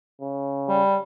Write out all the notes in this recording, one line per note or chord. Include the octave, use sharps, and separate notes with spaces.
C#3
G3